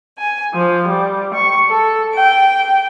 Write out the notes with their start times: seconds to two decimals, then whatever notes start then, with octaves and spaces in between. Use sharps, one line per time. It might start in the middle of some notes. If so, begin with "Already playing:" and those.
0.17 G#5
0.53 F3
0.88 G3
1.34 C#6
1.68 A4
2.13 G5